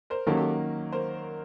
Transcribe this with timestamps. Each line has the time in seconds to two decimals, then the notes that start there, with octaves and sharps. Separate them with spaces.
0.10 A#4 C5
0.27 D#3 F#3 A#3 C#4 G4 A4
0.37 G4 A4
0.92 A#4 C5